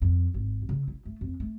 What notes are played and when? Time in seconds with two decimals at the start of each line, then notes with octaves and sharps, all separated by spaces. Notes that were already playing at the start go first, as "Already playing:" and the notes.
0.02 F2
0.34 G#1
0.69 C#3
0.88 E4
1.05 A3
1.21 F2
1.40 A3